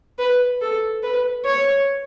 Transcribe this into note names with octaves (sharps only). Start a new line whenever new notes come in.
B4
A4
B4
C#5